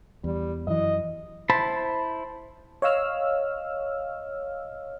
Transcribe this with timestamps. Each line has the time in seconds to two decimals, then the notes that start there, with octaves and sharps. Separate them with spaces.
0.24 E2 G3
0.67 F#2 E3 D#5
1.50 E4 C5 A5 B5
2.82 C#5 D#5 F5 E6 F6